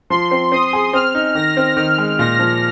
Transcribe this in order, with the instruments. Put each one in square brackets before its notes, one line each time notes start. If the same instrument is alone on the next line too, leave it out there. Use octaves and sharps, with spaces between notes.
[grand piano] F3 [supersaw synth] C6
[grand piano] C4
[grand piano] C4 [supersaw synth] D#6
[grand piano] G#4
[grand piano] C4 [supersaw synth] F6
[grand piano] D#4
[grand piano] D#3 [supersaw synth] A#6
[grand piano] C4
[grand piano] D#3 [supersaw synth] F6
[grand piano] G#3
[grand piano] A#2 [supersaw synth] A#6
[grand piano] F3